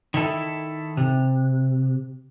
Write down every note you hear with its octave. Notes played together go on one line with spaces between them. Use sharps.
D#3 E4 A4
C3